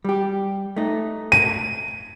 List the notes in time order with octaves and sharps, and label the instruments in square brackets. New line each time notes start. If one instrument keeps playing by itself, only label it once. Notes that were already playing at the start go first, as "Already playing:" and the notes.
[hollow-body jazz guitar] G3 G4
A3 D#4
[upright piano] D#7